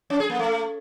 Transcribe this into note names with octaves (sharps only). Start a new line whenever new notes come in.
C#4
G#4
A#3
A3